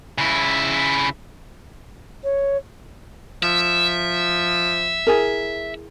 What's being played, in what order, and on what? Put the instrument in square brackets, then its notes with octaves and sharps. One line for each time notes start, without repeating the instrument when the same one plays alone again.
[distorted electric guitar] C#3 E4
[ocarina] C#5
[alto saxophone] F3 [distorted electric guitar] E5
[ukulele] E4 G#4 A#4